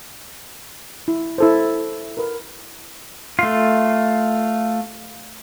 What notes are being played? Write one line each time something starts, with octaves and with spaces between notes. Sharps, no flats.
E4
E4 A4 C5
A#4 B4
A3 F4